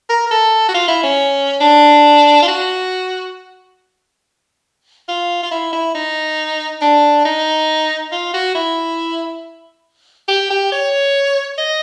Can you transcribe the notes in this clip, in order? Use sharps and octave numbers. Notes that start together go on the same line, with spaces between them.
A#4
A#4
A4
F#4
F4
E4
C#4
D4
F4
F#4
F4
F4
E4
E4
D#4
D4
D#4
F4
F#4
E4
G4
G4
C#5
D#5